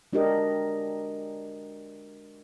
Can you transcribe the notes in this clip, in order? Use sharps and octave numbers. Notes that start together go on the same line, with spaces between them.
G#3 D4 F#4 G4 A#4 D#5